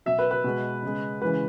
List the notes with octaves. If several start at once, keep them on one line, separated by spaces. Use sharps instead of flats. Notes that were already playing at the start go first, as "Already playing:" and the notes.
B2 F#3 E5
B4
B4
B2 G#3
C#3 G#3
C#3 E3 G#3 B4